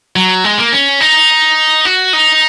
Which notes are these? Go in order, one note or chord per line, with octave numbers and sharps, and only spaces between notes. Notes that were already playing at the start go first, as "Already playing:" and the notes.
F#3
G#3
A#3
C#4
D#4
F#4
D#4